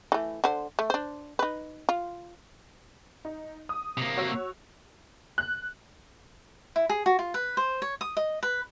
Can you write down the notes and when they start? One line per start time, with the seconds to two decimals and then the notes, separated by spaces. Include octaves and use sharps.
0.12 E3 A3
0.44 D3 C5
0.79 A3
0.90 D4 C5
1.39 D#4 B4
1.89 F4
3.25 D#4
3.69 D#6
3.98 C3 A#3
4.17 F#4 C#5 E6
5.38 F#6
6.76 E4
6.89 G#4
7.06 F#4
7.19 F4
7.34 B4
7.57 C5
7.82 C#5
8.01 D#6
8.17 D#5
8.43 B4